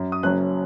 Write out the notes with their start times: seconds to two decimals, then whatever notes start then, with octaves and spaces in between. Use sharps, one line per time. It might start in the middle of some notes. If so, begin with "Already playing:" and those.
Already playing: F#2
0.12 D#6
0.23 F#1 F#2 F#3 C#4 F#6